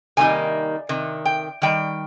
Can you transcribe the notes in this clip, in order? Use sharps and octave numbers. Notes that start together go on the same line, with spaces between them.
C3 D#3 G3 A#3 D#4 G#5
C3 D#3
G5
D#3 G3 G5